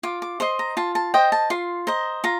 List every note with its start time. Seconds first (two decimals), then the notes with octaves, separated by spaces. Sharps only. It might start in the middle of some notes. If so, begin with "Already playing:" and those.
0.03 F4 D6
0.22 D6
0.40 C5 D#5 C6
0.59 A#5
0.77 F4 A5
0.95 A5
1.14 C5 D#5 G5
1.32 A5
1.50 F4 C6
1.87 C5 D#5 A#5
2.24 F4 A#5